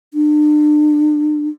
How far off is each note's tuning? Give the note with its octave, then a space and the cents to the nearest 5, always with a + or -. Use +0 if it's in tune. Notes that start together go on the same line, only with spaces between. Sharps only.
D4 +35